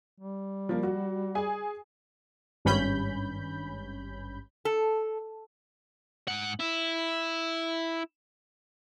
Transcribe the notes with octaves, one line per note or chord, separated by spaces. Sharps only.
G3
F3 A#3
F#4
G#4 G#5
G#1 G2 C#4 B5 G6
A4
G#2 F#5
E4